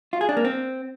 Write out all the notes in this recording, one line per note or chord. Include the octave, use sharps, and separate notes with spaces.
F4
G#4
D4
A#3
C4